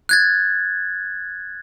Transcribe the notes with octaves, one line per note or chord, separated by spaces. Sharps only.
F#6 G#6 A6